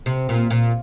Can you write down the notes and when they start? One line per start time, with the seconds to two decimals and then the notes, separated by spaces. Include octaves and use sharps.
0.06 C3
0.29 A#2
0.50 A#2